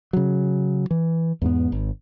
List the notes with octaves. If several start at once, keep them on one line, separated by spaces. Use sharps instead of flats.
C#3 F#3
E3
E2 G#2 B3
G#1